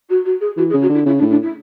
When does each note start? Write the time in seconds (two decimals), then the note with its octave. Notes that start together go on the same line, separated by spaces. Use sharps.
0.09 F#4
0.25 F#4
0.40 G#4
0.57 E3 F#4
0.69 G#4
0.74 C#3
0.81 F#4
0.89 D3 E4
1.06 C#3 E4
1.18 D4
1.22 A2
1.30 D4
1.42 E4